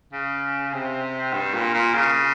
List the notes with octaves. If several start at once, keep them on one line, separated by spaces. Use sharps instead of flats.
C#3
C3
G2
A#2
A#2
C#3